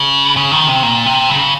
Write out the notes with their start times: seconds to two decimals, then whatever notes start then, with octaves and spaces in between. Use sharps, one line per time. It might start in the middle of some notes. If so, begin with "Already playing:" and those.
Already playing: C#3
0.37 C#3
0.52 D#3
0.67 C3
0.83 A#2
1.06 C3
1.30 C#3